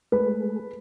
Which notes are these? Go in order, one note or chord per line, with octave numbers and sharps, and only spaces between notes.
G#3 A3 B4